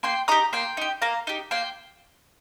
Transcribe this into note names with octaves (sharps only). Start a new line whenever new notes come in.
A#3 G5 C6
D#4 G4 A#5 D#6
A#3 G5 C6
D#4 G4
A#3 F5 A#5
D#4 G4
A#3 G5 C6